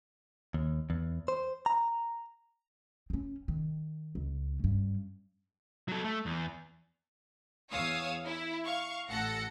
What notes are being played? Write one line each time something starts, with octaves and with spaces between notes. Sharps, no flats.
D#2
E2
C5
A#5
C4 C#4
D#3
C#2
G2 C#4
F#3 A4
A3
E2
E2 C#5 F5 D#6 E6
E4
F5 C#6
A1 A4 F#5 A#6 C#7